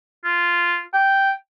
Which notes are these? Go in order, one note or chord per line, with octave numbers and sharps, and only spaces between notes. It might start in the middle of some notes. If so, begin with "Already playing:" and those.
F4
G5